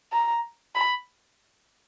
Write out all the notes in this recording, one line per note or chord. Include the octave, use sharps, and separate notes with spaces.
A#5
B5